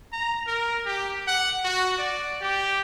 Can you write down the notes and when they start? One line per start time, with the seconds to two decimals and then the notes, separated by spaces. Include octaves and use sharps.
0.13 A#5
0.47 A#4
0.86 G4
1.28 F#5
1.65 F#4
1.98 D5
2.41 G4